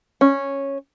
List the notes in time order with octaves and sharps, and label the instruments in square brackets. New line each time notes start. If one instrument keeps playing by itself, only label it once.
[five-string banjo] C#4